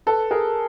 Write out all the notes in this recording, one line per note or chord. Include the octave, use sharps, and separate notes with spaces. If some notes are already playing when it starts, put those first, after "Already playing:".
A4 B4
G#4 A#4